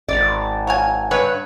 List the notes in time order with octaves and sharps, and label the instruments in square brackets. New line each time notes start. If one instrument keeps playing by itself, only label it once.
[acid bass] G#1 [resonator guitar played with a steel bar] D5
[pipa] F#3 F5 G#5
[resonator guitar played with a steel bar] G2 B4 C#5